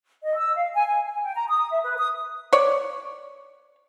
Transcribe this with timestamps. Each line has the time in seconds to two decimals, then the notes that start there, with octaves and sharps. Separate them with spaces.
0.23 D#5
0.37 E6
0.56 F5
0.74 G#5
0.86 G#5
1.06 G#5
1.23 G5
1.35 A#5
1.49 D#6
1.71 E5
1.83 B4
1.98 D#6
2.53 C#5 D5